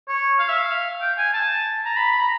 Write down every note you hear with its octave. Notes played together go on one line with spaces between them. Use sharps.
C#5
F5
E5
F5
G5
G#5
A5
A#5
B5
B5
A#5